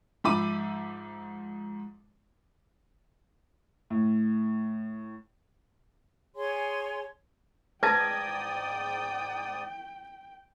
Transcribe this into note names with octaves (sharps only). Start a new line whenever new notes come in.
G#2 F3 E5 B5 D6 D#7
A2
G#4 C#5 G#5 C6
G#2 B4 D5 G5 A5 D#6 G#6 A#6